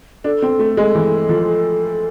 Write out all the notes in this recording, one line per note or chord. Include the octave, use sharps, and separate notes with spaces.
D4 A4
C4
A3
G#3
E3
F3